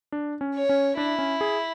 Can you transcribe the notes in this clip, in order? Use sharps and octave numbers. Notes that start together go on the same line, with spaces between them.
D4
C#4
C#5
C#4
D4 E4
C#4
G#4